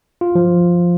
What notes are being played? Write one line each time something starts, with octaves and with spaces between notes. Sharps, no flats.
F4
F3